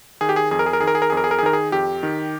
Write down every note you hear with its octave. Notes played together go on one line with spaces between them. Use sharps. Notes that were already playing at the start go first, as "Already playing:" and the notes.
D#3 G#4
G4
G#4
F2 G#4
A#4
G#4
A#4
D#3 G#4
A#4
G#4
A#4
F2 G#4
A#4
G#4
A#4
G#4
D#3 A#4
G#4
F2 G4
D#3